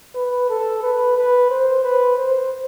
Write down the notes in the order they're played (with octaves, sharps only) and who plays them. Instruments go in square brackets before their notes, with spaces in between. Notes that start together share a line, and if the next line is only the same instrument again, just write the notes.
[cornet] B4
A4
B4
B4
C5
B4
C5